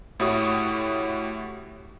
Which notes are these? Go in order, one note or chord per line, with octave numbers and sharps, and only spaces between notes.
A2 E4 F#4 G4 C#5 D#6